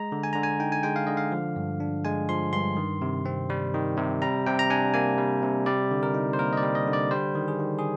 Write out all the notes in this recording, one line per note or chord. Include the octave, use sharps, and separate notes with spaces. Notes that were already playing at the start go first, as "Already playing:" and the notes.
Already playing: G#3 A#5
D3
G#5
D3 A#5
G#5
D#4 G5
G#5
G#3 G5
F5
D3 D#5
F5
F3
G2
D4
G#3 G#5
F3 C6
G2 C6
D#3
C3
C4
G3
D#3
C3
G3 A#5
C3 G5
A#5
D4 G#5
A#3 G#5
G3
C3
G3 D5
D3
A#4
D#4
C5
A#3 A#4
D#5
D5
G3
D#5
D3
D5
G3 C5
D#3
G#4
D#3
G#4